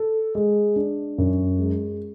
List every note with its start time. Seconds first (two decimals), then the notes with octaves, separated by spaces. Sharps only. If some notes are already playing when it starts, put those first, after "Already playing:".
Already playing: A4
0.35 G#3
0.76 D4
1.18 F#2
1.59 G#3